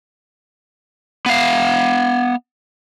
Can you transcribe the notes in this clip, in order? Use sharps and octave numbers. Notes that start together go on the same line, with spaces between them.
B3 F5